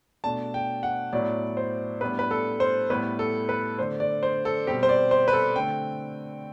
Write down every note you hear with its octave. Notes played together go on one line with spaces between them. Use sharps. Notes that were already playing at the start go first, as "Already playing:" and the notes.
B2 A3 D4 A5
G5
F#5
A2 F#3 B3 D5
C5
A2 G3 B3 D4 B4
B4
A4
C5
A2 G3 B3 B4
A4
B4
D3 A3 D4 C5
D5
C5
A4
B2 G3 C4 G4
C5
D5
C5
B4
A4
D3 A3 C4 G5